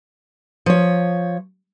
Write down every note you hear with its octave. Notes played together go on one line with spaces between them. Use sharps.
F3 C#5